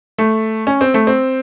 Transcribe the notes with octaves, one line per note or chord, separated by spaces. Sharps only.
A3
C#4
C4
A3
C4